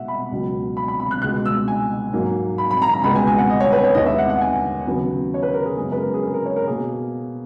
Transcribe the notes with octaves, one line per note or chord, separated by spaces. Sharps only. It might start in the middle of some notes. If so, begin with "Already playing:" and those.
Already playing: B2 G#3 E5 F#5
B5
C#2 B2 F#3
B5
B5
B5
F#6
C#2 B2 G#3 F#6
E6
G#5
G#2 F#3 A#3
B5
B5
A#5
A#5
C#2 B2 G#3 B3 B5
G#5
G#5
F#5
D#5
C#5
B4
C#5
D#2 D#3 G#3 B3 D#5
E5
F#5
F#5
G#5
D#2 C#3 F#3 B3
C#5
B4
A#4
G#4
F#2 C#3 G#3 B3 G#4
B4
A#4
G#4
A#4
A#4
C#5
A#4
B2 A#3 G#4